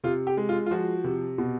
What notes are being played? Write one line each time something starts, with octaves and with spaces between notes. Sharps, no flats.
C3 F4
G4
G#3
F4
F4
F3 F#4
C3
B2